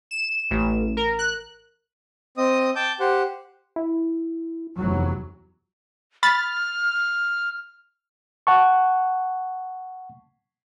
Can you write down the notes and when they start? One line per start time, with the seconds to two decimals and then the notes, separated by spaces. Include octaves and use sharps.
0.11 E7
0.51 A1
0.97 A#4
1.19 F#6
2.37 C4 D#5 D#6
2.76 G5 A5 D6 G6
3.00 G4 C5 F#5
3.76 E4
4.78 F1 E2 F#3
6.23 B5 F6 A6
8.47 F#5 A5 C#6